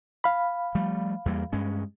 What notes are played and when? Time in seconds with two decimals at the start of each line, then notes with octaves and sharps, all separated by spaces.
0.24 F5 B5
0.75 F3 G3 A3
1.26 E2 G3 A#3
1.53 G2 G#3 C#4